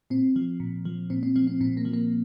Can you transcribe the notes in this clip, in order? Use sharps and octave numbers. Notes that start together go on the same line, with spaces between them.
A#2 C4
F3
A#2
F3
A#2 C4
C4
F3 C4
C4
A#2 C4
A#3
F3
A#3